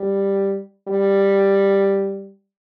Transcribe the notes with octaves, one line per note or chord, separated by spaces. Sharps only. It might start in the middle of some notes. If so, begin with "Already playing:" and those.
Already playing: G3
G3